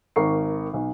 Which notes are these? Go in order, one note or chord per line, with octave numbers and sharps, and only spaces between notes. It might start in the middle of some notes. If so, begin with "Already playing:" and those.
G#1 A#4 C#6 C7
B1